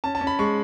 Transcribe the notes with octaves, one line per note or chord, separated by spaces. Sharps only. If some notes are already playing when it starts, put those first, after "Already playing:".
C#4 A5
A5
C#4
B5
G#3 C#6